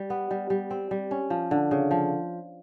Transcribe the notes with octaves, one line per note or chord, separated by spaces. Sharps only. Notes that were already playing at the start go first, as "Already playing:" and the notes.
Already playing: G3
B3
G3
G3
C4
G3
C#4
F3
D3
C#3
F3